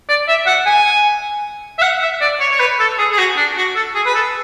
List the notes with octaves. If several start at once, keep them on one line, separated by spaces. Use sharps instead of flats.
D5
E5
F#5
G#5
E5
F#5
E5
D5
C#5
C#5
B4
A4
G#4
G#4
F#4
D4
F#4
A4
G#4
B4
A4